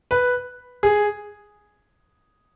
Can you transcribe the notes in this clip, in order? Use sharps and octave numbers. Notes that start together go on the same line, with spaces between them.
B4
G#4